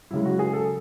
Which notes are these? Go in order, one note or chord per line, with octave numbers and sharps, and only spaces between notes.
F#2 C#3 G#3 E4
F#4
G#4
A4